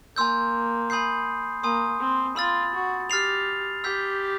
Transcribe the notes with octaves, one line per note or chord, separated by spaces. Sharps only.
A#3 G#5 C6 E6 G6
G#5 B5 D#6 G6 C7
A#3 G#5 C6 D#6
C4
F4 B5 E6 A6
F#4
G4 F6 A6 C7 F7
G4 E6 G6 B6